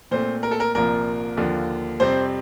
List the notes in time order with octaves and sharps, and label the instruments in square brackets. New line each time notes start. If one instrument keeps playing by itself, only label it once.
[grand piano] A#2 A3 C4 C5
A#4
A4
A#4
C2 A#2 F3 A#3 A#4
D#2 D3 F3 A#3
F2 C3 G3 C4 C5